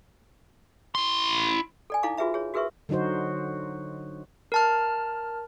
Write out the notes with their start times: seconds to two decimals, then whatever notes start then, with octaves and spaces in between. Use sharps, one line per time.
0.95 E4 C6
1.90 A4 D5 G#5
2.03 D#4 E4 A4 F5 A#5 D6
2.18 F4 F#4 G#4 B4 E5 A#5
2.34 G#4 C#5
2.54 F#4 G#4 A#4 B4 E5 C#6
2.89 D3 F#3 D#4 F#4 C5
4.52 A#4 A5 F6